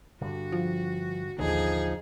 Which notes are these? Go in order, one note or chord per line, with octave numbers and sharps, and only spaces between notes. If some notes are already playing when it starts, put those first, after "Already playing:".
G2 D3 F#4
F3
A1 D#2 D3 F3 D#4 G#4